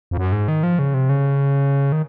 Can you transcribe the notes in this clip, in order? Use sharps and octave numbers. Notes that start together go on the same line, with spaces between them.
F2
F#2
G#2
D#3
F3
C#3
C3
C#3
D#3